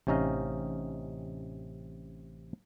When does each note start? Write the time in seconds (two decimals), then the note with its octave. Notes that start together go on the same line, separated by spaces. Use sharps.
0.07 A1 C3 C#4 D#4 D#5 F5